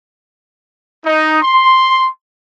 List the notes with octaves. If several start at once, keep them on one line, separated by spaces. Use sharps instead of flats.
D#4
C6